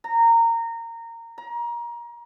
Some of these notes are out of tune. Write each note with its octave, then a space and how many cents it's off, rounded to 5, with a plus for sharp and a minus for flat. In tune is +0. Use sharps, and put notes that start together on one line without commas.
A#5 -20
A#5 +25